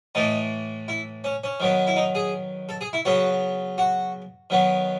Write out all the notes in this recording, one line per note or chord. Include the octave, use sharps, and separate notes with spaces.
A2 E3 A3 D#4
E4
C#4
C#4
D#3 F#3 B3
E4
D#4
G#4
A4
G#4
E4
C#3 F#3 B3 F#4
F#4
D#3 F#3 B3